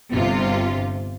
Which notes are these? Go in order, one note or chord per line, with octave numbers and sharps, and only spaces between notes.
G1 C3 F4